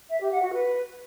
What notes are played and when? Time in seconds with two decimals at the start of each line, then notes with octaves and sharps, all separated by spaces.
0.10 E5
0.20 G4
0.31 F#5
0.42 F#4
0.53 B4